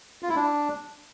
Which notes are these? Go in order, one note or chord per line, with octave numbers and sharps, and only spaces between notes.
F4
E4
D4